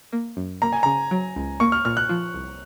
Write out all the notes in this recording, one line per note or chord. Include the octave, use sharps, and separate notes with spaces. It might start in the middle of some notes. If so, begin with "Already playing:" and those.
A#3
F#2
A#3 A#5
G#5
C#3 A#5
F#3
C#2
A#3 C#6
F6
A#2 F6
F#6
F3
C2